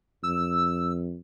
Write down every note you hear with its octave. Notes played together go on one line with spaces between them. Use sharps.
F2 E6